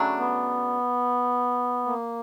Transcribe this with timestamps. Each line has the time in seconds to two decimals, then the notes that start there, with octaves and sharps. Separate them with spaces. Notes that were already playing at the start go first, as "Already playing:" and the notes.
Already playing: C#3 F#3 A3 D4
0.18 B3
1.86 A#3